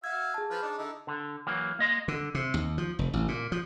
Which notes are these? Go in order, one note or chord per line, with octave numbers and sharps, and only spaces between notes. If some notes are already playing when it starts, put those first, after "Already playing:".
F#4 E5 F5 G#6
G#4 A5
F3 B4 F5
D4 D#4
D3 D#4 E4
D3
E3 F#3 A#3
A#3 D#5 C6
D3
C3
D#2
F3
F1
A1
A#2
F3